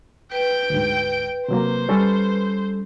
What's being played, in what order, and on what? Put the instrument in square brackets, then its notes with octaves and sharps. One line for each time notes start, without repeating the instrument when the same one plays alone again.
[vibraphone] B4 [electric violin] G5 D7
[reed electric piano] D2 G#2
[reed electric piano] C3 F#3 A#3 [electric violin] C5
[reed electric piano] G3 C#4 A4